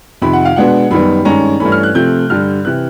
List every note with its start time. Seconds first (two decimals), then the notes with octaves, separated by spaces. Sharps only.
0.22 F2 C3 D#3 B5
0.33 F#5
0.45 F5
0.56 B2 G#3 B3 D4 F#5
0.91 F#2 D#3 G3 B3 B5
1.25 G2 D#3 G#3 C#4 A#5
1.60 G2 E3 A3 C#4 B5
1.72 F6
1.83 F#6
1.95 C3 F3 A3 C4 G6
2.30 G2 D3 G3 F6
2.65 C3 E3 F#6